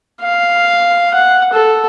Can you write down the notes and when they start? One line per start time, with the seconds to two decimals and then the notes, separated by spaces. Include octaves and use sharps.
0.22 F5
1.14 F#5
1.53 A4